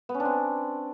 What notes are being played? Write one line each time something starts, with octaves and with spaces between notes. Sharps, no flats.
B3
C#4
D4
C4